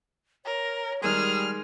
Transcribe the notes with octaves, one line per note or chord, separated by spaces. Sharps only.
A#4 C#5
D#3 G3 G#3 G#4 A#4 F6